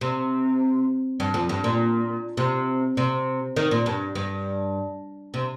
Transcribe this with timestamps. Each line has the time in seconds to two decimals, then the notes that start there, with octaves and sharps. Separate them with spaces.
0.01 C3
1.20 G2
1.34 F2
1.49 G2
1.64 A#2
2.37 C3
2.97 C3
3.56 D#3
3.71 A#2
3.86 G2
4.15 G2
5.34 C3